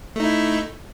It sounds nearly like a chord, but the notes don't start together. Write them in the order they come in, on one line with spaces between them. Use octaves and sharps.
A3 D#4 E4